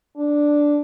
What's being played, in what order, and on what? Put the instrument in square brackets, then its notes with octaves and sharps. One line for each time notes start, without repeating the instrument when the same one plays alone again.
[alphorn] D4